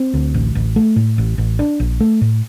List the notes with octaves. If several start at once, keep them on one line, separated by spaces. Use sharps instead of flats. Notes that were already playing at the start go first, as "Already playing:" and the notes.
Already playing: C4
D2
A1
A1
A3
A2
A1
A1
D4
A#1
A3
A2